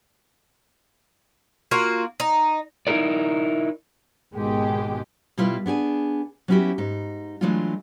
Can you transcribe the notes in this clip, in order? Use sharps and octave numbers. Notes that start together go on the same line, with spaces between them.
A#3 F4 F#4
D#4
D#4 E4 G4 A4 A#4 D5
G#1 B2 D#3 G#3 G4
B2 G3 E4 F4 B4 F5
B3 D4 G#4 G#5
F#3 B3 C#4 E4 F#4 G4
G#2 D#4
E3 F#3 G#3 A3 D4 F4